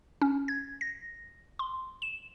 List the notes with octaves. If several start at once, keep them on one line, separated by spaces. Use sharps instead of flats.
C#4
G#6
A#6
C6
E7